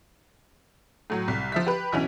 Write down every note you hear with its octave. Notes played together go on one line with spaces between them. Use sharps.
A2 F#3
C2
F3 E5 B6
G4 B4
B1 E3 C#4